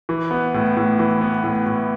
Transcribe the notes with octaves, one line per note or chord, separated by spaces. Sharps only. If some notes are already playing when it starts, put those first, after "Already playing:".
E3
B3
A2
A2
E3
B3
A2
A2